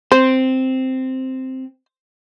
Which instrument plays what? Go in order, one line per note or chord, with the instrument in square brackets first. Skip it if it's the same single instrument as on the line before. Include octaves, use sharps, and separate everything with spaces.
[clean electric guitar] C4 [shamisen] C5